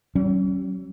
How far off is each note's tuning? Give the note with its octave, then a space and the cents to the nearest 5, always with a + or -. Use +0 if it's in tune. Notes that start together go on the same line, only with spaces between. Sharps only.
F#3 +40 C#4 -20